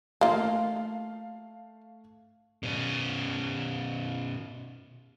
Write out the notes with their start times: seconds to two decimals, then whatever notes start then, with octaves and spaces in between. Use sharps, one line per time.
0.21 A3 A#3 F4 F5
2.63 B2 C#4